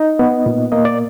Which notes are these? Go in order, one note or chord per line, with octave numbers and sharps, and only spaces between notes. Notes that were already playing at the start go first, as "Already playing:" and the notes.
Already playing: D#4 D#5
B3
A#2
A#3 D#5
D5